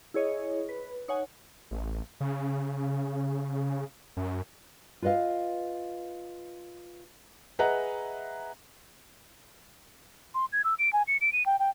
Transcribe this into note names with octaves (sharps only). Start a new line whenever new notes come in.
E4 G#4 C#5 D#5
B4
D#4 C#5 F#5 G#5
A1
C#3
F#2
F4 B4 D5 D#5 F5
G#4 B4 D#5 E5 F#5 A#5
C6
G#6
E6
D7
G#5
C#7
D7
D#7
G5
G5